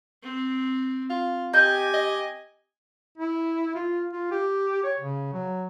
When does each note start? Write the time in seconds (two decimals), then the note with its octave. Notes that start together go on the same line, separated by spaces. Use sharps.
0.23 C4
1.10 F4
1.54 G4 D#5 G#5 G6
1.94 D#5
3.18 E4
3.75 F4
4.13 F4
4.31 G4
4.83 C#5
4.99 C#3
5.33 F#3